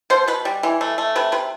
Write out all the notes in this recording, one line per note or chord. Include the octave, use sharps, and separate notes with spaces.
B2 C5
B2 B4
G3
E3
A3
A3
C3 B4
C3 B4